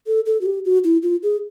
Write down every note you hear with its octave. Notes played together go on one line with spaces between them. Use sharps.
A4
A4
F#4
G4
F#4
E4
F4
G#4